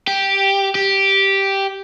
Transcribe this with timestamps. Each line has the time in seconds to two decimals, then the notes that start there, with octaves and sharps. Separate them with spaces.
0.07 G4
0.75 G4